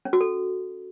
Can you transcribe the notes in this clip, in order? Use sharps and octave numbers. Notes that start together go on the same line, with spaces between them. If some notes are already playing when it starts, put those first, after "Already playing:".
C#4
F#4
A4